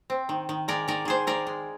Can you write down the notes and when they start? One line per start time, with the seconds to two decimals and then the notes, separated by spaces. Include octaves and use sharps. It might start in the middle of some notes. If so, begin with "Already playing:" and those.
0.10 C4
0.29 D#3
0.49 D#3
0.68 G#3 A#4 D5
0.88 D#3 A#4 D5
1.05 D#3 G#4 C5
1.27 D#3 A#4 D5
1.47 G#3